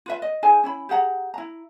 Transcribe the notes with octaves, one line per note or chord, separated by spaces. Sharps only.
F4 B4 E5
D#5
D#4 G#4 C5 G#5
C#4 E4 B5
G4 G#4 F#5 A#5
E4 A#5